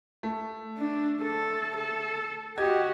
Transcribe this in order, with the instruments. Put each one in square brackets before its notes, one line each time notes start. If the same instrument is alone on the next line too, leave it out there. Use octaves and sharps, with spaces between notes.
[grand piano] A3
[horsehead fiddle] D4
A4
A4
[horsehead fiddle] F#4 G4 [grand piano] D#5 G#6